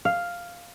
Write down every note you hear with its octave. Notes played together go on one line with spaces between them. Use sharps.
F5